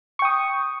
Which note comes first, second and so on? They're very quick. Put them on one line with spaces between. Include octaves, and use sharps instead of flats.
C#6 G5 D#6